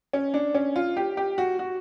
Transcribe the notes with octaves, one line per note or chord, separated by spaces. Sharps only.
C#4
D4
C#4
F4
G4
G4
F#4
F#4